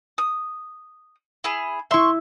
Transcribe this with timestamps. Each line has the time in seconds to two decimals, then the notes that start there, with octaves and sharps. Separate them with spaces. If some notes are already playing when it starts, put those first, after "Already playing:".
0.18 D#6
1.44 E4 G#4
1.91 E4 E5 C6 C#6